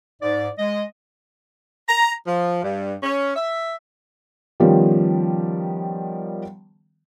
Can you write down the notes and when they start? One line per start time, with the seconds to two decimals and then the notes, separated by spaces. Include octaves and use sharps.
0.22 G#2 D5
0.59 G#3 D#5
1.89 A#5
2.27 F3
2.63 G2
3.03 C#4
3.36 E5
4.60 D#3 F3 G3 B3 C#4